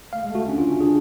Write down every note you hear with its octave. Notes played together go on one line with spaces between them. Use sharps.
A3 F5
G#3
A3 F#4
C#4 D4
F4
C#4
D4 G#4